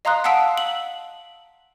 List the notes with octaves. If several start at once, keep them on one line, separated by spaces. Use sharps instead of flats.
D#5 F5 A#5 C6 D#6 F#6
F5 F#5 A5 E6 B6 D7
F#7